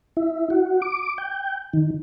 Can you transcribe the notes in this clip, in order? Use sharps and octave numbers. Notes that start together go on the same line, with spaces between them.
E4
F#4
D6
G5
D#3